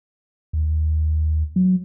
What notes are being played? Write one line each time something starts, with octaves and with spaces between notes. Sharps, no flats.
D#2
F#3